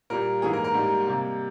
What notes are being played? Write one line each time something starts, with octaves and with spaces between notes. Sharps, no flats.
A#2 G3 A#3 A#4
G#2 E3 A#3 G#4
A#4
A#4
G#2 G3 A#3
C3 G3 A#3